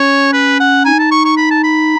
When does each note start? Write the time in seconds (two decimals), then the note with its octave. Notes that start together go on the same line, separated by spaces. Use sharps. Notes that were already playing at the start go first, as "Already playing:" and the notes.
Already playing: C#4 C#5
0.33 B4
0.60 F#5
0.85 D#4 G#5
0.99 A5
1.12 C#6
1.25 C#6
1.37 B5
1.51 A5
1.64 B5